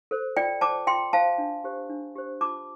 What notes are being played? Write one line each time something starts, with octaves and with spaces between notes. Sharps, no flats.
A4 C5
F4 D5 G5
C5 A5 D6
F4 G5 C6
C5 F5 A5
D4
G4 C5
D4
G4 C5
F4 A5 D6